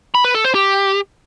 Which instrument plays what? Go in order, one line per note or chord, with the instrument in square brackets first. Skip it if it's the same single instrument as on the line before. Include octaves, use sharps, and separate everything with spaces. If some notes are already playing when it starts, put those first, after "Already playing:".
[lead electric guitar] B5
B4
A4
C5
G4